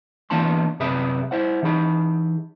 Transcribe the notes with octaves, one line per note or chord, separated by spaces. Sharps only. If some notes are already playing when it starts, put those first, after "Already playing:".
E3 A#3 B3 D4 A5 C6
F#2 C3 G#4 B4 E5 B5
E4 C5 F#5
E3 D#4 G#4 B5